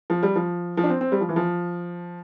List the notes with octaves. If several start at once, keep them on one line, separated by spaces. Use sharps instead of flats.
F3
G3
F3
F3
D4
C4
C4
G3
F3
E3
F3